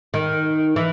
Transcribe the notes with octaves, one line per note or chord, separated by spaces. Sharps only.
D#3
E3